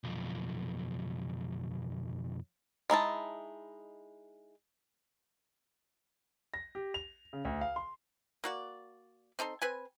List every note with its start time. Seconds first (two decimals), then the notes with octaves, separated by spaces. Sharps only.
0.04 B1 F2
2.90 G#3 D#4 E4 A5
6.54 A#6
6.75 G4
6.94 F7
7.33 C#3
7.45 D2
7.61 F5
7.76 C6
8.44 A#3 F#4 D5
9.39 C4 D#4 A4 C6
9.62 C4 B4 G#5